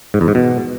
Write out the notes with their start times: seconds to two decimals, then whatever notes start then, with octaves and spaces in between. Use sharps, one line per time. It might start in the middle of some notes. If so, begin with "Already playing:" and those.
0.14 G#2
0.21 E2
0.28 G#2
0.35 B2